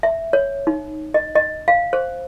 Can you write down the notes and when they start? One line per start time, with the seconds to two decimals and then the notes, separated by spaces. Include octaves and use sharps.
0.03 E5
0.33 C#5
0.67 D#4
1.14 D#5
1.36 D#5
1.68 F5
1.93 C5